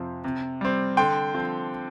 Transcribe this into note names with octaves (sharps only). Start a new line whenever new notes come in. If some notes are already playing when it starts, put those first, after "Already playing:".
Already playing: F2 C3 F3 C4
C3
G3 C4
D3 G5 C6
F3 C4